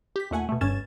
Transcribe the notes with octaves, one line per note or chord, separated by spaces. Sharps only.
G4 B6
D#2 A#2 A3 F#5 G#5
B2 A3
G1 G2 C#4 G#6 A6 E7